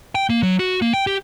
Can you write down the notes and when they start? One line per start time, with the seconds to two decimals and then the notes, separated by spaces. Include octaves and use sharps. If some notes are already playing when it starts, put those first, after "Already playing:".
0.15 G5
0.30 A#3
0.43 F#3
0.59 F#4
0.82 A#3
0.94 G5
1.07 G4